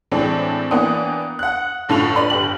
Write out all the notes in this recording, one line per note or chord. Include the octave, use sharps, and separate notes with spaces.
A2 E3 G#3 C4 D4
E3 A#3 B3 D4 G5 D#6
F#5 F#6
G1 A2 D3 F4 C#6 F7
B4 D5 B5
G1 G4 B4 F#7